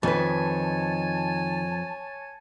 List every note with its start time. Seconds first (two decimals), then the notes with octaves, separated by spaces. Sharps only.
0.03 F2 D#3 B4 C#5 G#5 A5